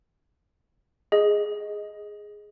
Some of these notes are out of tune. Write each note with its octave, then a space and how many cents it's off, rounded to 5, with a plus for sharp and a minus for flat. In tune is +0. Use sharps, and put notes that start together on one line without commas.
G#4 +0 D#5 +5